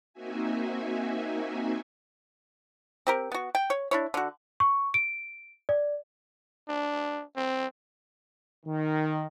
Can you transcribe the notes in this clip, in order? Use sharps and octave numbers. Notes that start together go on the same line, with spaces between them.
A#3 C4 D#4 F#4 E5 G#5
C4 G4 A#4
B3 F#4
G5
C#5
D4 E4 C#5
D3 F#4
C#6
D7
D5
D4
C4
D#3